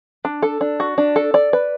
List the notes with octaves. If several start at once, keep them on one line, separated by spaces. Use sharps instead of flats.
D4
A4
D4
F#4
D4
A4
D5
B4